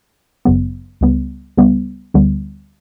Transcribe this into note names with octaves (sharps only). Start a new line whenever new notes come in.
G1 F#2 C#3 F#3 B3
C#2 C#3 G3 B3
C#2 C#3 G3 B3
D2 D3 G3 B3